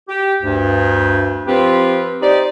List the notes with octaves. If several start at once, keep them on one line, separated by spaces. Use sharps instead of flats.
G4
D2 G2
F3 C4 F4 G4 B4
D#4 G4 C5 D5